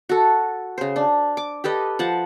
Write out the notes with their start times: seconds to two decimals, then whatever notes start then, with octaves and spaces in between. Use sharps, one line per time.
0.09 F#4 A4
0.78 C#3 C5
0.96 D4
1.37 D6
1.64 G4 A4 B4 D#5
1.99 F3 F#5 A5